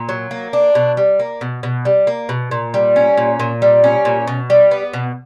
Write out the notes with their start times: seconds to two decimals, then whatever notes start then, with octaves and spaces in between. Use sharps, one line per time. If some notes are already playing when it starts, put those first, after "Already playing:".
Already playing: A#2
0.09 F#3
0.31 A#3
0.53 D4
0.75 B2
0.97 G3
1.19 A#3
1.41 B2
1.63 B2
1.85 G3
2.07 A#3
2.29 B2
2.51 A#2
2.74 G3
2.96 C#4
3.17 A#2
3.40 A#2
3.62 G3
3.84 C#4
4.05 A#2
4.28 B2
4.50 G3
4.71 B3
4.93 B2